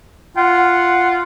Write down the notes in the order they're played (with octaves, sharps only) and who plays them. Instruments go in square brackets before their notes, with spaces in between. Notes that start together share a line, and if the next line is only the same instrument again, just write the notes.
[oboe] F4 [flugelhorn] F#5